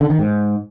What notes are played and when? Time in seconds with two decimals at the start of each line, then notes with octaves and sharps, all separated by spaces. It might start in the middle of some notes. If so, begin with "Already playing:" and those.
0.01 D3
0.10 D#3
0.19 G#2